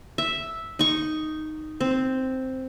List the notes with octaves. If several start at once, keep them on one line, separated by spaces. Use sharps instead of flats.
E5
D#4 C#6
C4